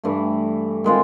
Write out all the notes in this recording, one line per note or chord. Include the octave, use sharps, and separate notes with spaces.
G2 E3 A3
D#3 G#3 C4 F4